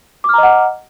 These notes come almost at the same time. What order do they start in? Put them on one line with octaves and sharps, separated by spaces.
D6 F6 A#5 D#5 F#5